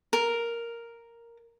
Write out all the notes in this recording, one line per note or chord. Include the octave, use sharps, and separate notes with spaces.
A#4